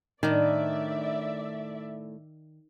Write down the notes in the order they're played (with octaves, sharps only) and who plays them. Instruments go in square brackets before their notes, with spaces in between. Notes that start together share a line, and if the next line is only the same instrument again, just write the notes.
[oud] A2 D4 [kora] D#3 [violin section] D5 E5